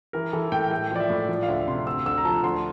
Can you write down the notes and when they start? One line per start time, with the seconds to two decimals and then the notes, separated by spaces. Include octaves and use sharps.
0.13 E3 A#4
0.33 E3 A4
0.52 A2 G5
0.71 A3 G5
0.91 F3 D5
1.00 E5
1.10 A2
1.29 F3 D5
1.43 F5
1.48 D2 E5
1.68 C3 C6
1.86 D2 E6
2.06 D2 E6
2.18 A#5
2.25 F3 A5
2.43 D2 C6